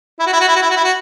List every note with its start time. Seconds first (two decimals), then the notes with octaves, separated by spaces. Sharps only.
0.19 E4
0.26 F#4
0.33 E4
0.40 F#4
0.48 E4
0.56 F#4
0.62 E4
0.70 F#4
0.76 E4
0.84 F#4